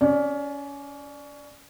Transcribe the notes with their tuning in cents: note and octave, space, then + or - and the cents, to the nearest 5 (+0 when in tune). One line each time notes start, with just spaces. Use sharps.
C#4 +25 D5 +0